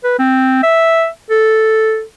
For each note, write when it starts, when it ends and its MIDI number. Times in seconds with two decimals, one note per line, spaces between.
0.04 0.15 71
0.19 0.63 60
0.63 1.07 76
1.30 2.03 69